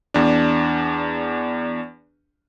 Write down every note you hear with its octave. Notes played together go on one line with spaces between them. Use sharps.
E2 D4